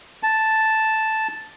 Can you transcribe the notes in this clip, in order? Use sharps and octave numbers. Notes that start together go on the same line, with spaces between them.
A5